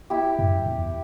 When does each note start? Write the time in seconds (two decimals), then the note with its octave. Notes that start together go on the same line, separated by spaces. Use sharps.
0.10 E4 G4
0.39 F#2
0.66 E2